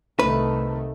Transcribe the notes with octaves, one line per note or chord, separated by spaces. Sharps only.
C2 D#3 A3 B4